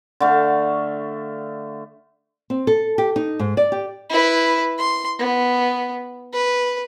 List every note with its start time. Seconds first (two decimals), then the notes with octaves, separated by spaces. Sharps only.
0.20 D3 A3 F5
2.50 C4
2.67 A4
2.98 G4
3.16 D#4
3.39 G#2
3.57 D5
3.72 G4
4.10 E4 B4
4.78 C6
5.19 B3
6.33 B4